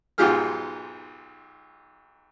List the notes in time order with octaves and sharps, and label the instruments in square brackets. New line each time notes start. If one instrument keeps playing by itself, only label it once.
[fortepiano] B1 G#2 F4 G4 G#4 F6